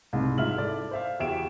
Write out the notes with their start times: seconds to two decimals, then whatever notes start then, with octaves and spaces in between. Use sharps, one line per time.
0.13 C2 G#2
0.38 G#2 F4 E5 F6 F#7
0.54 E4 A4 D5
0.91 C5 E5 F5
1.20 E2 F#4 G4 E5 D7 E7